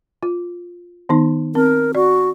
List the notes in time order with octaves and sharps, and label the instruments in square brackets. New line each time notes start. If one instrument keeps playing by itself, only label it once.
[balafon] F4
D#3 B3 D#4
[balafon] C4 [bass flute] A#4
[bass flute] F#4 [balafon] D5